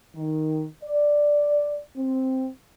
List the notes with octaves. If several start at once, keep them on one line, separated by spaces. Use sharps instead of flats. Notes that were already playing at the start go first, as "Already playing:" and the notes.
D#3
D5
C4